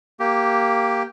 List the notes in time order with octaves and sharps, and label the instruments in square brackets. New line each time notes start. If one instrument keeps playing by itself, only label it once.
[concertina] A#3 G4